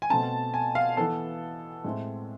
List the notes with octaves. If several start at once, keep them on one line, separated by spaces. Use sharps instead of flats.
G#5
B2 A3 C4 A5
G#5
F5
E3 B3 A4
A2 G#3 C4